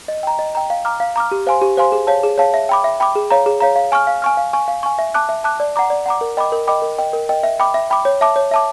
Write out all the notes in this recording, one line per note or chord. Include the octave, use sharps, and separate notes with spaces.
D#5
G5 A#5
D#5
G5 A#5
F5
A#5 D6 F6
F5
A#5 D6 F6
G4
C5 F5 G#5 C6
G4
C5 F5 G#5 C6
G#4
C#5 F5 A5
G#4
C#5 F5 A5
E5
G5 B5 D6
E5
G5 B5 D6
G#4
C#5 F5 A#5
G#4
C#5 F5 A#5
F5
G#5 C#6 F6
F5
G#5 C#6 F6
F5
G#5 C#6
F5
G#5 C#6
E5
A5 D6 F#6
E5
A5 D6 F#6
D5
F#5 A#5 D6
D5
F#5 A#5 D6
A#4
D#5 G5 B5 D6
A#4
D#5 G5 B5 D6
A#4
D#5 G5
A#4
D#5 G5
E5
G5 B5 D6
E5
G5 B5 D6
C#5
E5 A5 D6
C#5
E5 A5 D6